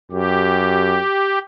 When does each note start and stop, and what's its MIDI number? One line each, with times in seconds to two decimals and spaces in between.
0.12 1.00 42
0.12 1.39 67